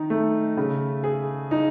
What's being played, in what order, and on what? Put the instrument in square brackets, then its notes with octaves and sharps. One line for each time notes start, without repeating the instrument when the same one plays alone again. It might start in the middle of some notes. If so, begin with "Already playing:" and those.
Already playing: [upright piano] D#3 D#4
A3
C#3
G#4
D#4